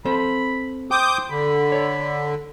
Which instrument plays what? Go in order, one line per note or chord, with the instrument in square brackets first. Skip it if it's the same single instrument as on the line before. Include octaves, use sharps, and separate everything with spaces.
[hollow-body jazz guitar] C4 A4 C5 [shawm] B5
[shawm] C5 [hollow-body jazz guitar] G5 [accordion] D6 D#6 G6
[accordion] D3 [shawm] B5
[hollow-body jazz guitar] C#5 D5